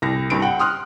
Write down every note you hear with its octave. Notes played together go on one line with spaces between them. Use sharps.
C2 A#6
C2 G2 D7
F#5 G5
C6 D#6 F6 F#6